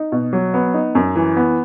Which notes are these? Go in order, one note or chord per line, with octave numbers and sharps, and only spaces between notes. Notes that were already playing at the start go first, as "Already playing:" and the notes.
Already playing: D#4
B2
F#3
B3
D#4
F#2
E3
B3